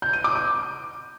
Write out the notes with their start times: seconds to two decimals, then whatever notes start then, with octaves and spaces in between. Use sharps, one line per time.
0.02 G6
0.13 D#7
0.24 D6
0.35 G6